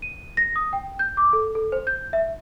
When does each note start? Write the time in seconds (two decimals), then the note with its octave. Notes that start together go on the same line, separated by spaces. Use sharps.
0.02 D#7
0.37 A#6
0.56 D#6
0.73 G5
0.99 G6
1.17 D6
1.33 A4
1.55 A4
1.72 C5
1.87 G6
2.13 E5